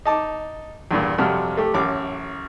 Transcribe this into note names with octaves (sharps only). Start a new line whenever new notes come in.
D#4 A5 D6
E2 G2 A#2
F2 C3 F#3 G3 F6
A3 G4
A1 F#2 D6